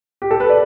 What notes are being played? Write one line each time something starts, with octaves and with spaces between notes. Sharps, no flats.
G4
A4
B4
D5